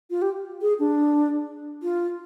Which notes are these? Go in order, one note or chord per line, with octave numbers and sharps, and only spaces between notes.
F4
G4
G#4
D4
F4